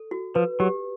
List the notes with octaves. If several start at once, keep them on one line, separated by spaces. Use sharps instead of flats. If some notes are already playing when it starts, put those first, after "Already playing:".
Already playing: A4
F#4
F3 B4
F#3 G4